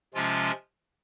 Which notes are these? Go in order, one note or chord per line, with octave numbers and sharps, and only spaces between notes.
C3 F3 G#3 C#4 F4